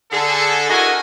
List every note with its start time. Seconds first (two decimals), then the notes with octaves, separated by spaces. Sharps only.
0.11 D3 G#4 A4
0.70 E4 F#4 A#4 D#5 G#5